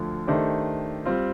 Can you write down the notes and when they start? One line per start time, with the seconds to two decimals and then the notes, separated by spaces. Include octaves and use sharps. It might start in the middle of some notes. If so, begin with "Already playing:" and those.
Already playing: D2 D3 F3
0.27 D#3 A3 D4 G4 C5
1.05 G3 C4 F4